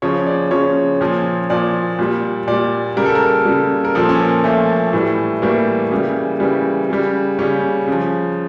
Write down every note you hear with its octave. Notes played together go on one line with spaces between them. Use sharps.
C#3 F3 C#5
D5
C#3 F3 C#5
A#2 F3
A#2 F3 D5
A#2 G3
A#2 G3 D5
C#3 G3 A#4
A4
A#4
C#3 G3
A#4
A#2 F3 A4
C#4
A#3
A#2 F3 A3
A2 E3 G3
A2 E3 G3 A#3
C#3 E3 G3
C#3 E3 G3
C#3 G3
C#3 G3 C#4
C#3 F3